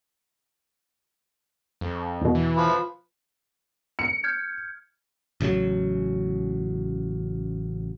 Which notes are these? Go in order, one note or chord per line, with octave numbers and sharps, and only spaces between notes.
F2
E2 B2
E3
F3 B4
C#7
F6 G6 G#6
A1 C#3 E3 F#3